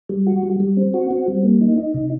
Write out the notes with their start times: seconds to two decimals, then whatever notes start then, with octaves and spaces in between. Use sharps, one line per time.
0.09 G3
0.27 F#4
0.43 G3
0.60 G3
0.77 C4
0.94 F#4
1.11 C4
1.28 G3
1.45 A#3
1.61 D#4
1.78 D#4
1.94 C3